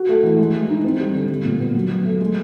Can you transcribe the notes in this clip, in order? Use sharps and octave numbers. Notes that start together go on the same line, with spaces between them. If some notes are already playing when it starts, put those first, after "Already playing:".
Already playing: F#4
A3
E3
G#3
G#3
D#4
C4
G3
D3
G3
A#2
B3
F#3
F#3
A3
G#3